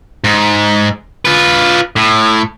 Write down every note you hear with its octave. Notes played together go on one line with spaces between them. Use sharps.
G#2
F4 B4
A2